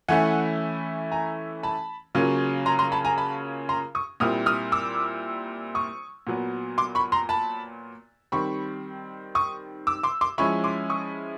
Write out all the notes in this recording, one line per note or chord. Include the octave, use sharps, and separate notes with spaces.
E3 A3 C#4 E4 F#5 G#5
G#5 A#5
A5 B5
C#3 F#3 A#3 C#4 F4
A#5 C6
A#5 C6
A5 B5
G#5 A#5
A5 B5
A#5 C6
C#6 D#6
A#2 G3 C4 E4 D#6 F6
D#6 F6
D6 E6
C#6 D#6
A#2 F#3 B3
C6 D6
B5 C#6
A#5 C6
A5 B5
D#3 G3 C4 B5 C#6
C#6 D#6
D6 E6
C6 D6
C6 D6
F3 G#3 C#4 E4 B5 C#6
C6 D6
C#6 D#6